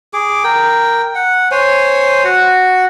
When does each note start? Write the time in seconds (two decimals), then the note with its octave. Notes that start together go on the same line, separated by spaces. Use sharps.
0.14 G#4 D6
0.44 A#4 G5
1.15 F#5
1.51 C5 C#5 G#5
2.24 F#4 F#5